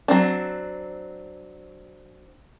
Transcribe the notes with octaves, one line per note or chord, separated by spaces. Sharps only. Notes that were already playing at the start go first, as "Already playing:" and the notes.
F#3 C4 D4